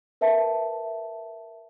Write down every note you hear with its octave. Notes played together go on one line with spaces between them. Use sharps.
A#4 B4 E5 A5